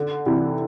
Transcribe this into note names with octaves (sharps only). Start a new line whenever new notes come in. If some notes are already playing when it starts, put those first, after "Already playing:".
Already playing: D3
C3 E3